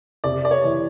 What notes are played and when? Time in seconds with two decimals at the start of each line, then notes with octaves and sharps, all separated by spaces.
0.24 C3 D5
0.45 D5
0.51 C#5
0.64 E3